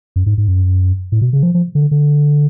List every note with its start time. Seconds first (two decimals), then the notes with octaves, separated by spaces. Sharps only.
0.16 F#2
0.26 G#2
0.38 G#2
0.48 F#2
1.12 A2
1.21 B2
1.33 C#3
1.43 F3
1.54 F3
1.75 D3
1.91 D3